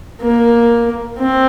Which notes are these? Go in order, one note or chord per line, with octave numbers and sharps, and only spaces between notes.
A#3
C4